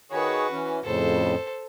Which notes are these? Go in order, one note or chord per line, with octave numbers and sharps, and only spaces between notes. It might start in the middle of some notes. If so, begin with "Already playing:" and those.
D#3 F#4 G#4 B4 C#5
E3 C#4
F2 A2 C#3 A4 C5